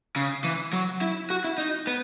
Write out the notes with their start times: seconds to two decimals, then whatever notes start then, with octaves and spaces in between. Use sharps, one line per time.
0.16 C#3
0.44 E3
0.73 F#3
1.01 E4
1.30 F#4
1.44 E4
1.58 D#4
1.87 B3